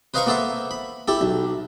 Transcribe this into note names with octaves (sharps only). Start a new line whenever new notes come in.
B4 C5 D#5 F5 A#5 C#6
A#3 B3 A4 C5 E5
B5
E4 G4 A4
B1